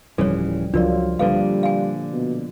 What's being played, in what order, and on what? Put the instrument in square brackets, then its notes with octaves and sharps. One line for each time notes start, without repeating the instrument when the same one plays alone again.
[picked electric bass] D1 C#3 E3 [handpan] F3 G3 [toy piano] A4 C#5
[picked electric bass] C#2 [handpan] F3 F4 [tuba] F#3 [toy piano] D4 A#4 D5
[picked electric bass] A#2 D3 [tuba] G3 [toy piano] A4 B4 F5
[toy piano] F5 G#5
[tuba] B2